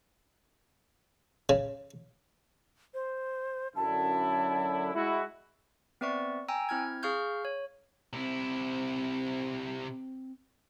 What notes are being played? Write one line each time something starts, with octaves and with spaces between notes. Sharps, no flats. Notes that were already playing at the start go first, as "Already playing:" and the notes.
C#3
C5
F#2 D3 E4 A5
G#3 E4 F#4
B3 C4 B4 D5 E5 C#6
G5 G#5 A#5 E6
C4 E4 F6 G#6
G#4 F5 C#6 F6 G6
C#5
C3 C4 E4